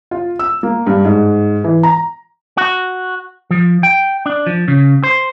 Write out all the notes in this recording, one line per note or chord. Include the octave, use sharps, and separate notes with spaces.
F4
E6
A#3
G2
G#2
E3
A#5
F#4
F3
G5
D4
F3
C#3
C5